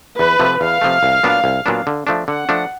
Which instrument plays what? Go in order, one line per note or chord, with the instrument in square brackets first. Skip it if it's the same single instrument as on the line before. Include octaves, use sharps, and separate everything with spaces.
[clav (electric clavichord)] E2 [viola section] B4
[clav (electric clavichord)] C3 F3 A3
[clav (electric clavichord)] E2 [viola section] F5
[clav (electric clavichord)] C3 F3 A3
C2
A#2 F#3 B3 D4
C2
A#2 F#3 B3 D4
D3
F3 A3 D4
[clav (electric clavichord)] D3 [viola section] F#5
[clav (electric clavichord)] F3 A3 D4